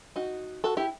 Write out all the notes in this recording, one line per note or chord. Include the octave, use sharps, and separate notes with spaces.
D#4 F#4
F#4 A4
E4 G4